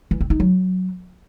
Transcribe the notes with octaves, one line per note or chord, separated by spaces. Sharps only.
E3
C4
D#4
F#3